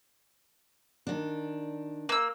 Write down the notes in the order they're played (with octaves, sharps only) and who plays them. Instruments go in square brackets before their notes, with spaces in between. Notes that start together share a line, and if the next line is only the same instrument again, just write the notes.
[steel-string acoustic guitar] D#3 D4
[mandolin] A#3 E6